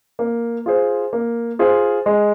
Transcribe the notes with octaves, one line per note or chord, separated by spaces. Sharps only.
A#3
F4 G#4 C5
A#3
F4 G#4 C5
G#3